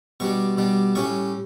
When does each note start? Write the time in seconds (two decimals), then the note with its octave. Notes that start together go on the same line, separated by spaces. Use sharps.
0.20 B2 G3 D4 C#6
0.57 B2 G3 D4
0.95 A2 G3 C#4 C#6